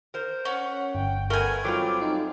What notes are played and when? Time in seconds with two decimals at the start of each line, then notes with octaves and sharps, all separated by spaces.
0.14 A#4 C5
0.45 C#4 F#5
0.95 G1 G5
1.30 A3 B3 A#4 G#5
1.65 F#3 G3 C4 F4 F5 D6
2.01 D#4